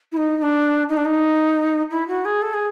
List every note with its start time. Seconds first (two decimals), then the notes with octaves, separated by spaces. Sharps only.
0.12 E4
0.17 D#4
0.37 D#4
0.42 D4
0.89 D#4
0.96 D4
1.05 D#4
1.91 E4
2.08 F#4
2.25 G#4
2.42 A4
2.53 G#4